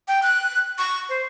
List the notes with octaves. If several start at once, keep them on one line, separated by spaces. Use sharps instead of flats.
G5
F#6
C#6
C5